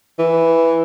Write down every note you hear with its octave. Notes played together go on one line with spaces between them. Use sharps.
E3